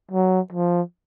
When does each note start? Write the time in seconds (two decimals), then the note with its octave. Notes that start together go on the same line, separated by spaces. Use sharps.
0.11 F#3
0.52 F3